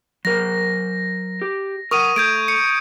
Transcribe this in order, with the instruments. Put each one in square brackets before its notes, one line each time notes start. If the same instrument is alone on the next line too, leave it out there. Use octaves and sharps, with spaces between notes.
[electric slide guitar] F#3 A#4 C5 [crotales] A#6
[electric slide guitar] G4
[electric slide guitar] A#4 F#5 [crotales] C#6 D#6 D#7
[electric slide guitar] A3 [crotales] G6 G#6 D7
[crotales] C#7